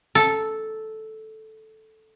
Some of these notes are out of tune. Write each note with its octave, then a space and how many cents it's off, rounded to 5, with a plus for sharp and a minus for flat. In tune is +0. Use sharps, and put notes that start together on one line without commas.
A4 -5